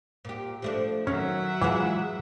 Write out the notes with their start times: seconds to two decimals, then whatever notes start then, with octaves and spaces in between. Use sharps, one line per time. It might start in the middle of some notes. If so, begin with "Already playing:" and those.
0.25 A#2 G4
0.62 F3 A3 D4
1.07 D#3 F#3 C#4 E5 F#5
1.62 E3 G#3 F4 G#4